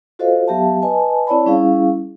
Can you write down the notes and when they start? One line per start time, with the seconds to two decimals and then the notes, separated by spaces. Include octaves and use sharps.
0.19 F4 F#4 A4 C5 D#5 F5
0.48 F#3 B3 G4 E5 F5 A5
0.82 B4 D#5 G#5 A5
1.27 C4 E4 C#5 D5 A5 B5
1.46 G3 C#4 E4 G#4 F5